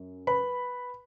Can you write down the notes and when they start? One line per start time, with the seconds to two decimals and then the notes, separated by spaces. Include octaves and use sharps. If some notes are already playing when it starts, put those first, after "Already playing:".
Already playing: F#2
0.27 B4 B5